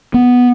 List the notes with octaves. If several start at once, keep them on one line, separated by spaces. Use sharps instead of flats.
B3